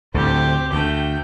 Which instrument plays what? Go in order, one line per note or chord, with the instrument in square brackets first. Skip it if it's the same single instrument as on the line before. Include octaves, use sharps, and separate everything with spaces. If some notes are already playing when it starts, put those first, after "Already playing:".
[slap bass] D2 A2 D3 [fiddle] C4 G4
[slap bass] D2 [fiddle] A3 G5